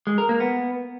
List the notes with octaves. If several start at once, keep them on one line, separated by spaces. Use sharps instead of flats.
G#3
A#4
A#3
B3